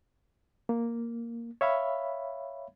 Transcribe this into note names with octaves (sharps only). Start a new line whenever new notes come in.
A#3
C#5 E5 F5 B5